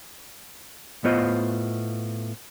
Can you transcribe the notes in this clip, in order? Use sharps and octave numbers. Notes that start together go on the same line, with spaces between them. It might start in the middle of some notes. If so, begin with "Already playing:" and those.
A2 B3 F4 C5 D#5